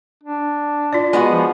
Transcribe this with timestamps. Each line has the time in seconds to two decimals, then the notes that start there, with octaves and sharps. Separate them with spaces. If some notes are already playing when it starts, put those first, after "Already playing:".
0.23 D4
0.93 F4 D5
1.13 G#3 B3 F#4
1.31 F3